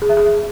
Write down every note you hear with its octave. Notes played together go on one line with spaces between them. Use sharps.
G#4
E5
G#4